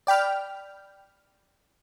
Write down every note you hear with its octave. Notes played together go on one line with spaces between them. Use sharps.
D5 G5 B5 F6